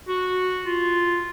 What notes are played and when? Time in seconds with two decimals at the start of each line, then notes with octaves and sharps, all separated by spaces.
0.08 F#4
0.65 F4